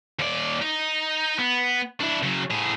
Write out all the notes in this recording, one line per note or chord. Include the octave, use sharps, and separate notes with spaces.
D#2 D5
D#4
B3
D4 E4
C#3 F#3
A2 G#4